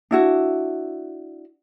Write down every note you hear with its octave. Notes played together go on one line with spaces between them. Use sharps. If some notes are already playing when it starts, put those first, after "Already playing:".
D4 E4 F#4